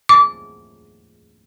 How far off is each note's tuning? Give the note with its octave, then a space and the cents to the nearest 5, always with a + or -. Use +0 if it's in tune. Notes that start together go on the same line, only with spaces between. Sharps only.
D6 -20